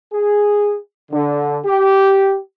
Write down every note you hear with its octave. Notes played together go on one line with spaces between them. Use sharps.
G#4
D3
G4